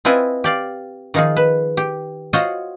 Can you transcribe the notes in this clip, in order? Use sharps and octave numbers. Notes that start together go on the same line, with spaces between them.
C4 E4 F4 B4 D#5 G#5
G4 D5 F5
D#3 F3 D#4 F4 G#4
B4
G4
F4 F#4 C5 C#5 D#5